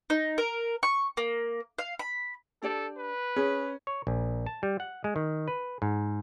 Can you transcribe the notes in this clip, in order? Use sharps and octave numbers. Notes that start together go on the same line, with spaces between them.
D#4
A#4
C#6
A#3
F5
B5
D4 G4 A4 D5
B4
C#4 G#4
C#5
A#1
A5
G3
F#5
G#3
D#3
B4
G#2